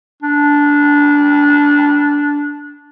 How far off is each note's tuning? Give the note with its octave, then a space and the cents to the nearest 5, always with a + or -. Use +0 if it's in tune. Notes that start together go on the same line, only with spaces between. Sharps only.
D4 -15